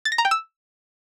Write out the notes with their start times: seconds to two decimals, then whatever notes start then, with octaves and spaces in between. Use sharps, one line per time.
0.05 A6
0.12 A#6
0.18 A#5
0.25 G5
0.31 E6